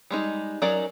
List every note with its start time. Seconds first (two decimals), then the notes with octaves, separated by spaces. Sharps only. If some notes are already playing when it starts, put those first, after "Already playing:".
0.11 G3 G#3 D#4
0.62 F#3 C#4 D#4 A#4 D5